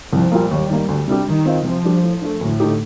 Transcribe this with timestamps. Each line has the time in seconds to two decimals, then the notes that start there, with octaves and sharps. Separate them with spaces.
0.12 C2 F3
0.32 A#2 G3 A#3
0.50 D#2 G3
0.70 D#3 A#3
0.89 D2
1.08 C3 G3 D4 G4
1.27 D#3 G3
1.46 C4 F4 C5 D#5
1.65 C3 F3
1.84 G3 D4 G4
2.03 A2
2.22 A3 D4
2.41 D2 A2
2.60 D3 A3 D#4 G4